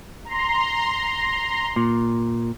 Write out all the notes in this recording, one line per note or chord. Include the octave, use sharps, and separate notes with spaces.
A#5 C6
A#2